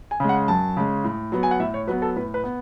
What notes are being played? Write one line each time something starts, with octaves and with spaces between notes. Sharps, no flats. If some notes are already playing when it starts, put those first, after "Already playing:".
G#5
C#3 G#3
F#5
F#2 A5
C#3 G#3
A2
F#3 B3
G#5
F#5
A2 E5
C#5
F#3 B3 B4
A4
A2 B4
B4
B3